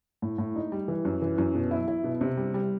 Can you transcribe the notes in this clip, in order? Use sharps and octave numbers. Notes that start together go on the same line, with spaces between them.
A2
A2
D#4
G3
E3
F#2
E3
F#2
B2
E4
E4
B2
C3
G3
G3